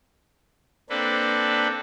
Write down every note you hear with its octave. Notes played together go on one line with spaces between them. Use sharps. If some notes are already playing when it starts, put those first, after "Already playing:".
A#3 C4 D4 A4 B4